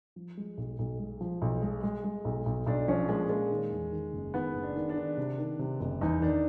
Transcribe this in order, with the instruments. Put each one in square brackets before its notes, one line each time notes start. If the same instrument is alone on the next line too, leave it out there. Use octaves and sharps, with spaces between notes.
[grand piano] F3
G#3
B1
B1
G#3
F3
B1
G#3
G#3
G#3
B1
B1
[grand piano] B1 [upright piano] D4
[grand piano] F3 [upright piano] C#4
[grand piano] A#2 [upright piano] G#3
[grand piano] A#2 [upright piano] G#3
[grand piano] D#3
E2
D#3
F#1
[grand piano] D#3 [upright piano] B3
[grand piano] F#1
[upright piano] D4
[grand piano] D#3
[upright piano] D4
[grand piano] D#3
C3
D#3
C3
F#1
[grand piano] E2 [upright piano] D#4
[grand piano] D#3 [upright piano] D4